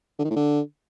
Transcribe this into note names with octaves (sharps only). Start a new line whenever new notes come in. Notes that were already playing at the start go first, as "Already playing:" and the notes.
D3
D#3
A2
D3